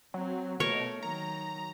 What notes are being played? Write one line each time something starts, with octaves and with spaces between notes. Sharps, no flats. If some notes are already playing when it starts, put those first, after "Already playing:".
F#3 C4
B2 A3 A#4 C#5
D#3 F#3 A#5